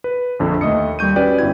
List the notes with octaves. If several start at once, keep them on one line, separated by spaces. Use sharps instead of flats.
B4
A#1 F2 D3
D#2 A3 D#5 D#6 C#7
D#2 G3 C#6 G6 D#7
C#4 F#4 G4 B4 D5 G5
G1 C#4 E4 G#6